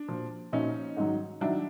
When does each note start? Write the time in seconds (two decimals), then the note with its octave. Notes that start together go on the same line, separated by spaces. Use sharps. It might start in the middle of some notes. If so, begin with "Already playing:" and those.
Already playing: D4
0.08 A#2 F3
0.53 A#2 F3 C#4 D#4
0.97 G#2 D#3 F#3
1.41 D#3 F#3 D4 E4